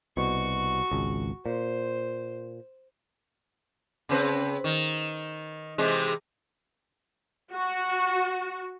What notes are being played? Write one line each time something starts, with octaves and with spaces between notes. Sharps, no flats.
C2 B2 F#4 C#6
G#1 C#2
A#2 C5
C#3 C4 B4
D#3
C3 E3 G#3
F#4